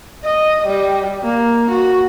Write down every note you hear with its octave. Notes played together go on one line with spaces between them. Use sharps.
D#5
G3
A#3
F#4